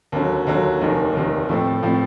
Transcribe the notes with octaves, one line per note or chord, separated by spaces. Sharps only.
D#2 D3 F#3
D#2 D3 F#3
F1 D#2 D#3
F1 D#2 D#3
A2 F3 A3 C4
A2 F3 A3 C4